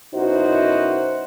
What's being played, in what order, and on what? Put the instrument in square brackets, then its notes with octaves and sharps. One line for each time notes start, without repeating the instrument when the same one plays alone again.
[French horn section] F#2 B2 D#4 E4 F#4 C5